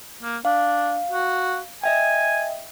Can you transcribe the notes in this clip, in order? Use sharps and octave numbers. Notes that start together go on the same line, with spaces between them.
A#3
D4 F5
F#4
D#5 E5 G5 G#5